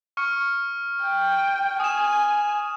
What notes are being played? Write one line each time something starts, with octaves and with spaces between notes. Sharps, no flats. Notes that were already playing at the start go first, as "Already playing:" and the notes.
C#6 F6 C#7
G5
G#5 D#6 E7